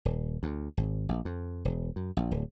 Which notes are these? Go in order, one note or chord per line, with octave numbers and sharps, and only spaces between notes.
D#1
D2
G#1
A#1
F2
E1
F#2
A#1
D1